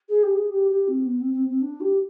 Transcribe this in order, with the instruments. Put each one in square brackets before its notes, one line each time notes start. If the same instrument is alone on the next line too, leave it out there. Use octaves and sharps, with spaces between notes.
[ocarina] G#4
G4
G#4
G4
G4
C4
B3
C4
C4
C4
D4
G4